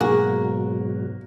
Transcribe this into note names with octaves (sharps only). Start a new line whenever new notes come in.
G#2 B2 F#3 A#3 F#4 G#4